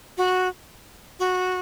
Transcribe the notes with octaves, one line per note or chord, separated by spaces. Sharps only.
F#4
F#4